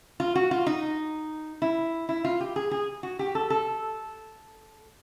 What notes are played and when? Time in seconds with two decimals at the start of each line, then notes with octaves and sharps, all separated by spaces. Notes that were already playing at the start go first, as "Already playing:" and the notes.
0.20 F4
0.35 F#4
0.51 F4
0.66 D#4
1.62 E4
2.09 E4
2.25 F4
2.40 G4
2.56 G#4
2.71 G#4
3.03 F#4
3.19 G4
3.35 A4
3.50 A4